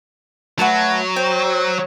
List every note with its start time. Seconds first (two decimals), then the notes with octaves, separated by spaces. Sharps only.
0.59 F#3 A3 F#4 B4 A5
1.16 C5 G5